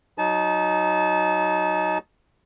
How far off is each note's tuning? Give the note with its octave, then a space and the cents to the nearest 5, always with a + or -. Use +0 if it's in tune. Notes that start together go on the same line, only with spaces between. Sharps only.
F#3 +0 D#4 +0 A5 -30